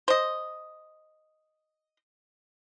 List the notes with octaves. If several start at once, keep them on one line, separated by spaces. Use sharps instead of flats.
C5 D#5